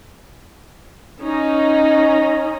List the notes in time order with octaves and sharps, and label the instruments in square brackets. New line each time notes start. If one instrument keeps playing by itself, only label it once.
[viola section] C#4 D#4